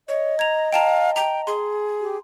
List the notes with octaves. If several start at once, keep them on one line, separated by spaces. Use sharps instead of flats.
C#5 D#5
A#5 G#6 F7
F5 G5 A5 A#5
G5 A#5
G#4 C6
G4